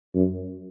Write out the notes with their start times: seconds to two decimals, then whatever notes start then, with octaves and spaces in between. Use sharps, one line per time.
0.15 F#2